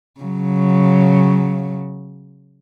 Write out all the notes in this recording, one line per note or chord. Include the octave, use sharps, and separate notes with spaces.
C#3 F#3